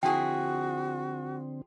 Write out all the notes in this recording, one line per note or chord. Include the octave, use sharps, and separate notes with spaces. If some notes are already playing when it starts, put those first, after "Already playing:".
D3 F3 C4 E4 F#4 G#4 G5